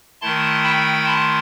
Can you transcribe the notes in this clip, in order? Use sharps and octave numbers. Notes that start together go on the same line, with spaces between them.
D#3 A3 E4 A5 C6
G5 B5
A5 C6